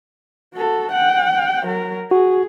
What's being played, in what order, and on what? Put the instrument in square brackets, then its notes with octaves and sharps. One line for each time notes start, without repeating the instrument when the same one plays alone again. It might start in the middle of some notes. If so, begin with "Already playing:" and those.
[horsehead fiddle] F#4 A4
F#5 G5
F#3 A#4
[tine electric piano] F#4 [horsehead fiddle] G#4